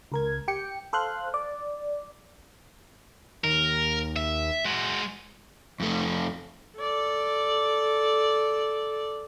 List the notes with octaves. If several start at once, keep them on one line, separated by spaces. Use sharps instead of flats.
C#2 A#4 G#6
G4 G5 C#7
A4 C5 F5 C6 F#6
D5
D#2 A#4
E5
G#3 F#4
F2 A3
A4 D5